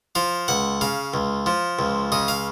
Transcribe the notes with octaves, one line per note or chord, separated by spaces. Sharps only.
F3 F5
C#2 F#5
C#3 F5
C#2
F3
C#2
C#3 D#5
F5